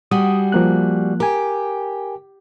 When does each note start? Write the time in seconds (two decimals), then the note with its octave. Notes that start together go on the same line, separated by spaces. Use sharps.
0.11 G3 F#4 G#4 D#6
0.52 F3 A#3 F#6
1.20 G4 A#4 G#5